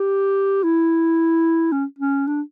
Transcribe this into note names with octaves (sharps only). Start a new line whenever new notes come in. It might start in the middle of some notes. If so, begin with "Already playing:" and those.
Already playing: G4
E4
C#4
C#4
D4